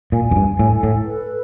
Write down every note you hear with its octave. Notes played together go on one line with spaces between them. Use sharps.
A#2 G#5
F#2
G2
A2 A4
A2
B4